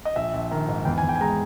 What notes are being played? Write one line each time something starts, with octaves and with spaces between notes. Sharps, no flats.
D#5
A#1 E5
A#1
D#3
G#2
E2 G5
G#5
E2
G5
G#5
G#3 A#5